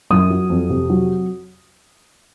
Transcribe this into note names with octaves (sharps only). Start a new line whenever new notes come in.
F#2 D#6
F#3
F2
C3
F#3